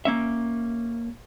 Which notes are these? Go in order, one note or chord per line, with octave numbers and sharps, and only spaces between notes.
A#3 C#4 E5